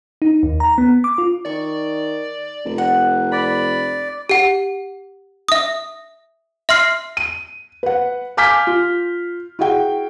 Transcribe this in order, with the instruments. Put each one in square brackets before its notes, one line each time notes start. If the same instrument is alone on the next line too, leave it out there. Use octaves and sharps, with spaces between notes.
[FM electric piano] D#4
D#2
A#5
B3
D6
F4
[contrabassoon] D#3 [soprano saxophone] D5 [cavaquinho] C#6
[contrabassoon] F1
[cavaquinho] F#5
[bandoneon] D5 [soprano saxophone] B5
[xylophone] G4 F#5
E5 D#6
E5 C6 F6 C7
[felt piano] D#7
B4 F#5
F5 G#5 D6 F6 G6 B6
F4
E4 F#4 G#4 F#5 G5